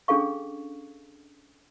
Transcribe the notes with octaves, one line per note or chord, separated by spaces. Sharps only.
C#4 D4 G#4 A4 F5 C#6